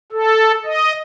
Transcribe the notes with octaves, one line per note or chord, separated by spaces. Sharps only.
A4
D#5